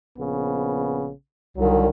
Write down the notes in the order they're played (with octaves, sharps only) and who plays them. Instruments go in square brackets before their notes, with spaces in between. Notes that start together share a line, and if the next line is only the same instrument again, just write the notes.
[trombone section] A#1 C#3 B3
[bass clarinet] C2 [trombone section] D3 D#3 F#3